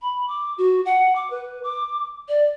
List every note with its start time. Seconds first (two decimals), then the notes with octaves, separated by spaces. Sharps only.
0.02 B5
0.28 D6
0.58 F#4
0.86 F#5
1.16 D6
1.30 B4
1.63 D6
2.28 D5